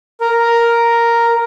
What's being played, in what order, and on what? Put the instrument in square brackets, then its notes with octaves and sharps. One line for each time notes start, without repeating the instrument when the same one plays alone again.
[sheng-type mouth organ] A#4